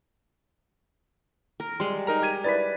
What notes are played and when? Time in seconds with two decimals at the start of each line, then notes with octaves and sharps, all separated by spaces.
1.60 A#4
1.80 G3 G#3 C6
2.07 D#4 A#4 A#5
2.22 G4 G#6 D#7
2.44 E4 B4 D5 A6 B6